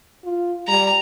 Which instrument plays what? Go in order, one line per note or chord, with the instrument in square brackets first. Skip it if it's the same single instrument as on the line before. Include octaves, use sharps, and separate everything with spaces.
[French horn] F4
[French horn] G3 [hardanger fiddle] A#5